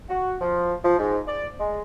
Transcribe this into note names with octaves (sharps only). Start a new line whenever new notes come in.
F#4
F3
F3
G#2
D5
G#3